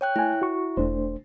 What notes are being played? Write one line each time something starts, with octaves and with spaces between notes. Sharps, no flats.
C#5 G5 F#6
A3 E4 G#5
F#4 C#6
E1 A3 D4 C5